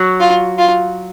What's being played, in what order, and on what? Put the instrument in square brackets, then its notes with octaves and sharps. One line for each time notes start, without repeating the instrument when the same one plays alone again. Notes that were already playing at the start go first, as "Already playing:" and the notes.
Already playing: [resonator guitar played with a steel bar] F#3
[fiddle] F4
F4